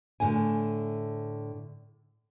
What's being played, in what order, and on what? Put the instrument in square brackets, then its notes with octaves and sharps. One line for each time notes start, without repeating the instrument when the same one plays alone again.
[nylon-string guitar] A2 D3 E4 G#5